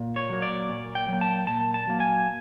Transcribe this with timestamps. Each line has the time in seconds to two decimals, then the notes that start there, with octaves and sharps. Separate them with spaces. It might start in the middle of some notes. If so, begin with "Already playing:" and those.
Already playing: A#2
0.16 C#5
0.29 F#3 A#3
0.42 D5
0.69 A#2
0.95 G5
1.08 F#3 A#3
1.21 A5
1.47 A#2 A5
1.74 A5
1.87 F#3 A#3
2.00 G#5